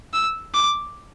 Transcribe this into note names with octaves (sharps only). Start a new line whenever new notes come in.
E6
D6